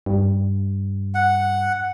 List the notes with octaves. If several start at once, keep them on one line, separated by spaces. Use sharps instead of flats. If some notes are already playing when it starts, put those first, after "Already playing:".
G2
F#5